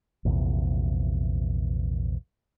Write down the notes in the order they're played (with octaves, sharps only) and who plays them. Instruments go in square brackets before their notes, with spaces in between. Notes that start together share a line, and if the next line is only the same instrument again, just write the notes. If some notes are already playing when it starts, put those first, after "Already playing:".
[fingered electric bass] A#1 E2 C3